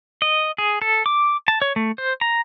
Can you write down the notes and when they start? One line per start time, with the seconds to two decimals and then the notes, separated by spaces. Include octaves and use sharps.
0.22 D#5
0.58 G#4
0.82 A4
1.06 D6
1.48 A5
1.62 C#5
1.76 A3
1.98 C5
2.21 A#5